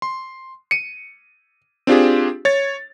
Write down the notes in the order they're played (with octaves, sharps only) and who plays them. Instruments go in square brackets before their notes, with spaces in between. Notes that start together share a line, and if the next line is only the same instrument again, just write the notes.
[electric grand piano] C6
C#7 D#7
C4 D4 F4 G4 G#4
C#5 A6